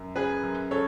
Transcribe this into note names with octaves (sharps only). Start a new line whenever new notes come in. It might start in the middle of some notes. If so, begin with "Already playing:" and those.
Already playing: F#2
C#3 G#4 B4
F#2
C#3 A4 C#5